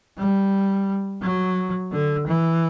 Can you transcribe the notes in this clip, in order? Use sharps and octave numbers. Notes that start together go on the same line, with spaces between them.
G3
F#3
D3
E3